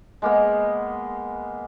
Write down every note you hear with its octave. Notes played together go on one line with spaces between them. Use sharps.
G#3 A#3 B3